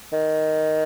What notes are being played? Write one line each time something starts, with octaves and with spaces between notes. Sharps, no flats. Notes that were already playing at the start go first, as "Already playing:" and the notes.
D#3